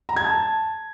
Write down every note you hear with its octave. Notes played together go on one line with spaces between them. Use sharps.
A#5
G#6
A5